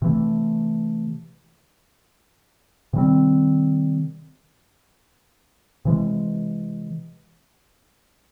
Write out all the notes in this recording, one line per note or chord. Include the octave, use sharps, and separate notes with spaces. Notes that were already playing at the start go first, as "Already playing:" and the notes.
C3 E3 A3
C3 D#3 G3 C4
C3 E3 G#3